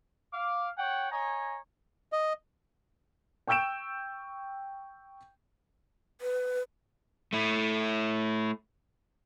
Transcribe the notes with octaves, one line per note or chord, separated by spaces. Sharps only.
F5 D6
C#5 F#5 G5
C#5 D#5 G#5 A#5
D#5
G5 C#6 E6 G6 D7 E7
B4
A3 E4